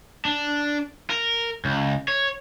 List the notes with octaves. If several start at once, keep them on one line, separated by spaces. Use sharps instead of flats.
D4
A#4
C#2
C#5